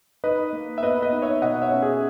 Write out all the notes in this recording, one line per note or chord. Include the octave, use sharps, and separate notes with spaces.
D#4 B4 D#5
A#3
E5
B3 B4 D#5
B4 D#5
D#4
C#5 E5
B2 D#5 F#5
C#5 E5
C#4
G#4